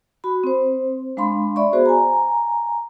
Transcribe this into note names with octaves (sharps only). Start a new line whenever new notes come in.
F#4 B5
C4 C5
G#3 D4 F5 B5 C6
D5 E5 B5 C#6
B3 F#4 G#4 C5
G#5 A#5